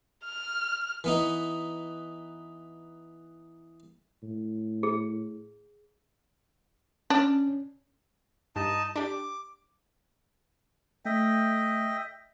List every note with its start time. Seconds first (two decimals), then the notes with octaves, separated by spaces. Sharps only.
0.25 F6
1.04 E3 B3 D#4
4.23 A2
4.83 G#4
7.10 C#4 D4
8.56 G2 D#4 A5
8.96 D4 G4 D6
11.05 A3 D#5 E5 G5